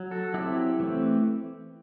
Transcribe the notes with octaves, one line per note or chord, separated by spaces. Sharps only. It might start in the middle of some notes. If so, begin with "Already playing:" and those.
Already playing: F#3
F#4 A4
F#3 C4 E4 G4
E3 A3 C4